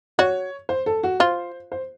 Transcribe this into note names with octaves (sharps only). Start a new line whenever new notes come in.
F#4 C#5
C5
A4
F#4
F4 C5
C5